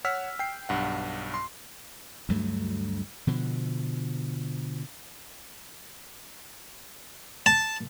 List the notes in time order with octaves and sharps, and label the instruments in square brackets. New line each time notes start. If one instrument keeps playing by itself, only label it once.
[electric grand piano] C#5 F#5 E6 F6 B6
G5 C7
B1 G2 F#5
C6
[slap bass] D2 G2 F#3 A3
B2 D3 F3
[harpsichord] A5